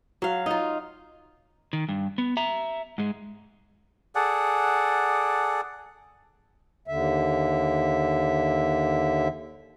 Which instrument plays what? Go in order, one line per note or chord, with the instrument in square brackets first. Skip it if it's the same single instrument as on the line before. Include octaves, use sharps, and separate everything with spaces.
[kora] F#3 F5
D#4 F4
[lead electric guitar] D#3
G2
B3
E5 A#5
G#2 G#3
[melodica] G#4 A4 D5 F#5
[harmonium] D#2 D3 E5